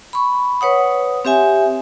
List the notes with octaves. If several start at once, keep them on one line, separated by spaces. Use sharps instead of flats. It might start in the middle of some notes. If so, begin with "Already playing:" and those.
B5 C#6
B4 C#5 F#5 D#6
C4 G4 E5 G#5